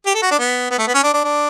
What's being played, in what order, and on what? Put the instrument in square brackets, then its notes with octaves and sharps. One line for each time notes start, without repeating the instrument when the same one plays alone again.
[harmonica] G4
A4
F#4
D4
B3
B3
A3
B3
C#4
D4
D4
D4